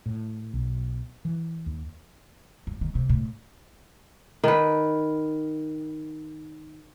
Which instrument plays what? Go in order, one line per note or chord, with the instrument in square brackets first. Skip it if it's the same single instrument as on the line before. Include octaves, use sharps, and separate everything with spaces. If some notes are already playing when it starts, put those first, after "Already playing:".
[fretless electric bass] A2
B1
E3
D#2
[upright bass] G2
D#3
C3
A2
[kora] D#3 B4